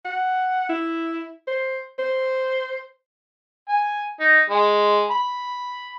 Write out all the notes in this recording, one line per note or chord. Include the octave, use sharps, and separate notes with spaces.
F#5
E4
C5
C5
G#5
D#4
G#3
B5